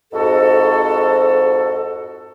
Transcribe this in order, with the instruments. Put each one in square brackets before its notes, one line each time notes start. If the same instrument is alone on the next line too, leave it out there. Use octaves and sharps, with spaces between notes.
[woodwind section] F2 G#2 F#4 A4